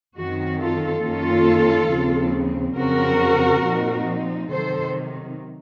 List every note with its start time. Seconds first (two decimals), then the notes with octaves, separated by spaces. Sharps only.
0.16 F#2 D#3 F#3 C4 F#4
0.60 F4 A4
1.03 F#2 D#3 A#3 C#4 F4 A4
1.90 D#2 C#3 F3 C4
2.77 F2 C#3 F#3 C4 F#4 A#4
3.64 A#2 F3 C4 D#4
4.51 C3 D#3 F#3 A4 C5